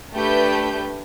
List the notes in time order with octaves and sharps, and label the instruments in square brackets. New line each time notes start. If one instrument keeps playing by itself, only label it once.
[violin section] A3 D4 G4 B4 G6